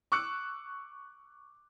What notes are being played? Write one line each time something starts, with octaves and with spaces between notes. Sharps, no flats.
C#6 D6 E6 F#6 C#7